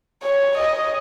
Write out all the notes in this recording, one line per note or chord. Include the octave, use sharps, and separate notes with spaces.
C#5
D#5